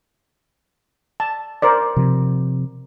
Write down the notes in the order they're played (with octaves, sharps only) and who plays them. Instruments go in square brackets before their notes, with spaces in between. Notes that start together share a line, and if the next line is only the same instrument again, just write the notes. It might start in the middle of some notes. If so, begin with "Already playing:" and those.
[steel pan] A5
A#4 C5 D5
[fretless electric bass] C3 F3